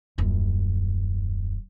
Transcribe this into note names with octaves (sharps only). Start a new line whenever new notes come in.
D#1 F#2